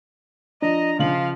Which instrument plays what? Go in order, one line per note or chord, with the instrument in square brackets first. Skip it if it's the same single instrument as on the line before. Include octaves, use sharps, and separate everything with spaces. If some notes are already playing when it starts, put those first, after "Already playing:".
[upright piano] F3 [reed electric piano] D4 [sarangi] D#5 [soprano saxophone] A#5
[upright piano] C#3 F#7 [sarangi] F3 [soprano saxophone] F5